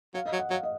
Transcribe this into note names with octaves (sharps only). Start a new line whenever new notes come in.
F#3 F5
D#5
F#3
F#5
F#3 F5
D#5